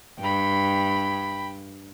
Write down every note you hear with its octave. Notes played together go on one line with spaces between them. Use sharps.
G2 G5 B5